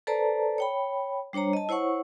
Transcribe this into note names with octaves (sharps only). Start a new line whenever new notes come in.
A4 B4 C5 D5 A5 A#5
C#5 G5 B5
G3 D4 C5 C#5 A#5
D#5 A5
E4 C5 C#5 F#5 C#6